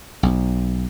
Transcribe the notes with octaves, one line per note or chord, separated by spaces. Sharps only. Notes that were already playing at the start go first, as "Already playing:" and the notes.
B1